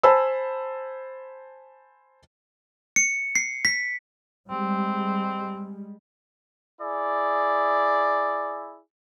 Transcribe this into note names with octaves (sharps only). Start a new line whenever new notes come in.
C5 G#5 A5 B5 E6
C#7
C7
B6
G3 G#3 C4
E4 G#4 D5